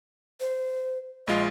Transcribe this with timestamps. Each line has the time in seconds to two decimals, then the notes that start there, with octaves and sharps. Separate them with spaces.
0.40 C5
1.27 A#1 G#3 F4 D#5